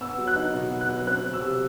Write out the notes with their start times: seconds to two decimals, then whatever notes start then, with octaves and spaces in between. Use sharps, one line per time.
0.01 B3 E6
0.18 F#3
0.27 F#6
0.36 D#4
0.54 B2
0.71 B3
0.81 F#6
0.89 F#3
1.07 C4 F#6
1.24 F#3
1.33 E6
1.42 C3